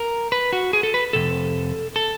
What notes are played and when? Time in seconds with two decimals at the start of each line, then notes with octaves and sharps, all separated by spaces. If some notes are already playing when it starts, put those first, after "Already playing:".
Already playing: A#4
0.32 B4
0.53 F#4
0.73 G#4
0.83 A4
0.94 B4
1.13 F2 C3 A4
1.96 A4